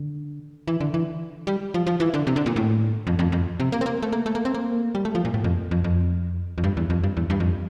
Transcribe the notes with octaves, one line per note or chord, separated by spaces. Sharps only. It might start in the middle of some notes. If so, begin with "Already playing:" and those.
Already playing: D3
E3
D3
E3
G3
F3
F3
E3
D3
C3
D3
A#2
A2
F2
F2
F2
C3
A#3
C4
A#3
A3
A#3
A3
A#3
C4
A#3
G3
A3
F3
A#2
A2
F2
F2
F2
F2
G2
E2
F2
G2
E2
G2
F2